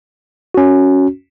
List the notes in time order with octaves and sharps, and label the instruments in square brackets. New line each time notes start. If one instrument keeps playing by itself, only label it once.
[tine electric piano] C#4 F#4